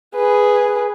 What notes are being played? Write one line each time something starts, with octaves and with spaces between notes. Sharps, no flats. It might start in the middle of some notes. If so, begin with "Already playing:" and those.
G#4 B4